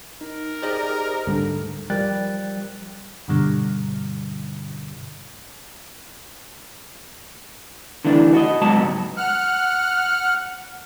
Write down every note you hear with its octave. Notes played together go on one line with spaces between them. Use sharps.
D#4 A#4
D#4 G4 G#4 C5 D5 D#5
D2 G#2 G3 D4 A4
F3 G3 A#4 G5 F#6 A6
G2 B2 D3 G3
D3 E3 A3 D4
F#4 D#5
C#2 G#2 F#3 B3 D#5 A5
F#5 F6 F#6